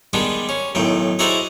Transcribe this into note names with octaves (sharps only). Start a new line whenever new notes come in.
D#3 G3 G#3 B3 D4
C#4
B1 A2 D#3 G5
D#4 E4 F#4 G#4 C5 D5